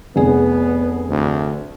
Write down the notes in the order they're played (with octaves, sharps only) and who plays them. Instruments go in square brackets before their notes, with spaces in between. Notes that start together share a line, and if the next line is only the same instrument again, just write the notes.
[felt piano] F1 G#4 [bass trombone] B3
[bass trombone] D2